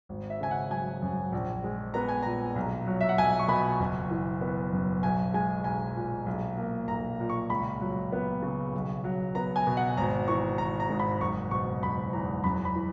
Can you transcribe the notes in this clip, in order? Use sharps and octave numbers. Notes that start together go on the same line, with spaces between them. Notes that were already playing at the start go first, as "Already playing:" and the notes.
G#1
E5
C#3 G#5
F#5
F#3 G#5
F#2
A#1
G#3
B3 A#5
G#5
A#2 A#5
B1
F#3
E5
F#5
B1 G#5
C#6
B2 B5
F#1
E3
B3
F#2
B1 G#5
G#3 G#5
B1 G#5
A#2
B1
A#3
B1 A#5
A#2
C#6
C#2 B5
F#3
B3
C#3
B1
F#3
B3 A#5
G#5
B2
F#5
G#1 A#5
E3 C#6
G#1 A#5
A#5
G#2
B5
F#1 C#6
B2 C#6
F#1 B5
E2 A#5
F#2 B5
B5
E3